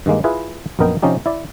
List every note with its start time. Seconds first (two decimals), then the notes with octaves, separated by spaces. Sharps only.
0.06 G2 D#3 G#3 A#3
0.24 E4 F4 G#4 B4
0.79 A#1 F#2 B3 A#4 D#5 G5
1.02 C3 F3 C#4 D#4 G4
1.26 E4 D5